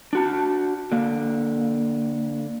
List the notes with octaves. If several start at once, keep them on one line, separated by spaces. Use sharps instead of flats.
D4 F#4 A5
D3 A#3